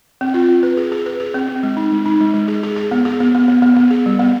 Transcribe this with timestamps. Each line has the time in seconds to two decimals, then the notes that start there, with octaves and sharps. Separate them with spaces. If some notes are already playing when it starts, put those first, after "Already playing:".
0.21 C4
0.34 F4
0.49 C4
0.63 B4
0.77 G#4
0.92 G#4
1.06 B4
1.20 G#4
1.34 C4
1.49 C4
1.63 G#3
1.77 D#4
1.92 G#3
2.06 D#4
2.21 G#3
2.34 G#3
2.48 G#4
2.63 G#4
2.76 G#4
2.91 B3
3.05 G#4
3.20 B3
3.35 B3
3.48 B3
3.62 B3
3.76 B3
3.91 G#4
4.06 G3
4.19 B3